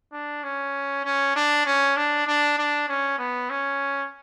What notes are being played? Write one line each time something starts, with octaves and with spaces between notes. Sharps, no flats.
D4
C#4
C#4
D4
C#4
D4
D4
D4
C#4
B3
C#4